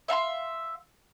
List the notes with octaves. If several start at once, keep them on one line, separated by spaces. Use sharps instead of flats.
E5 F5 A#5 C6